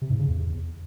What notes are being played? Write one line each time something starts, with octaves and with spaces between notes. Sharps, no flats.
C3
G#2
C#3
E2